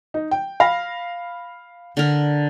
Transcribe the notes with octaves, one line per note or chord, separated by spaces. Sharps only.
D#4
G5
F5 B5 A#6
D3 A#4